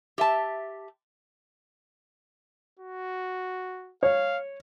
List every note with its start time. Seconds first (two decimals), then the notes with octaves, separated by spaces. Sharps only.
0.18 G4 E5 A5
2.79 F#4
4.03 C#5 F5